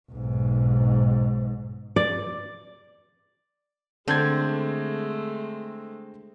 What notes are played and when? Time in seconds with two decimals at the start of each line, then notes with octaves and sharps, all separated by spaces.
0.11 B1 G#2
1.96 D5
4.08 D3 G#3 A3 C4 D5 G6 G#6